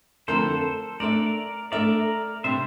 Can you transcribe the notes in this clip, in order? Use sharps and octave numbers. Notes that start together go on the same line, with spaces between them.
F2 D3 A3 E4 A4 A#4 C5
A3 D4 A4 A#4 D5 E5
A3 D4 A4 A#4 D5 E5
C3 G3 D4 C5 E5